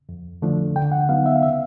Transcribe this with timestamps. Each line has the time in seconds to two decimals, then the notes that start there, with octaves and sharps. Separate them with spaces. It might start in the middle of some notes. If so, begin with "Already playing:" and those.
0.09 F2
0.42 D3 F3 A3 D4
0.76 D3 G5
0.92 F#5
1.09 F#3 B3 D#4 F5
1.26 E5
1.36 F5
1.43 C#3 E5